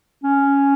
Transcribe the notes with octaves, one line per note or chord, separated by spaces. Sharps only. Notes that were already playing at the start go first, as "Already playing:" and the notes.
C#4